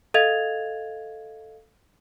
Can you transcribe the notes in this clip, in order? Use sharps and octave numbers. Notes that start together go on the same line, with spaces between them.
A4 D#5 F5 G#6 A6 F7